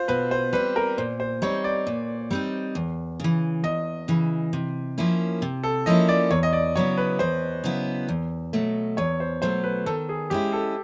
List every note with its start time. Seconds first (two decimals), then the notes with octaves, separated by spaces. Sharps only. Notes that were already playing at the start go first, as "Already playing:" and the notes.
Already playing: F4 C5
0.08 B2 B4
0.31 C5
0.53 G3 C4 B4
0.76 A#4
0.98 A#2 C5
1.20 C5
1.42 G3 C4 D#4 C#5
1.64 D5
1.87 A#2
2.31 G3 C4 D#4
2.75 E2
3.20 C#3 E3
3.64 E2 D#5
4.08 C#3 E3
4.53 C3
4.98 F3 A#3 C#4 E4
5.42 C3
5.64 A4
5.86 F3 A#3 C#4 E4 D#5
6.09 D5
6.31 E2 C#5
6.43 D#5
6.53 D5
6.75 C#3 F#3 B3 E4 C#5
6.97 B4
7.19 E2 C5
7.64 C#3 F#3 B3 E4
8.09 E2
8.53 B2 F#3 A3
8.97 E2 C#5
9.20 C5
9.42 B2 F#3 A3 C5
9.64 B4
9.86 D#3 A4
10.09 G#4
10.30 G#3 C#4 E4 G4
10.53 A4